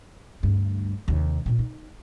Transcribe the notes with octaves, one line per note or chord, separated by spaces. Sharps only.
D2 G2
D#2 C3
A#2 C4
D#4